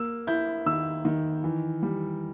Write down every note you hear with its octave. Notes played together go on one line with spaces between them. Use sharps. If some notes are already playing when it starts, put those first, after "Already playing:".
Already playing: A#3 E6
E4 G6
D#3 E6
D#3
E3
G3